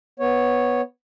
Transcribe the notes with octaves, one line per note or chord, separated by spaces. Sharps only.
B3 C#5